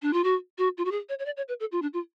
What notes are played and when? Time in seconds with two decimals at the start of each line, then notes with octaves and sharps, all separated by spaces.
0.02 D4
0.13 F4
0.24 F#4
0.58 F#4
0.78 F4
0.85 F#4
0.91 G#4
1.09 C#5
1.19 C#5
1.26 D5
1.37 C#5
1.48 B4
1.60 A4
1.72 F4
1.82 D4
1.93 F4